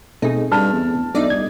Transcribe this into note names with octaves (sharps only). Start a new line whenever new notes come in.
B2 A3 C4 D#4 G#4
G2 A5 F6
E2
B1 A3 D4 D#4 D5 E5
G1 A3 D#5 G#6